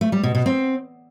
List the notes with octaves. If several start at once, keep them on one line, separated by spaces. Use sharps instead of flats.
A3
G3
B2
B2
C4